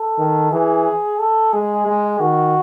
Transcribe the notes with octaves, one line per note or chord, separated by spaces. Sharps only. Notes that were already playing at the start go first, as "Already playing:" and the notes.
Already playing: A4
D#3
E3 G#4
A4
G#3 G#4
G#3
D#3 F#4